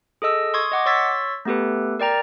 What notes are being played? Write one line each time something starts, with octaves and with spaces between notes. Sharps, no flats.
G#4 A4 D#5 E6
C6 C#6 D#6 G#6
D#5 F#5 D6
C#5 C6 C#6 E6 A6 B6
A3 B3 G4 A4 B4
A#4 D5 G5 A#5